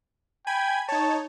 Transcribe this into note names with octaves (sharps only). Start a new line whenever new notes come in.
G5 G#5 B5 G#6
D#4 C#5 A5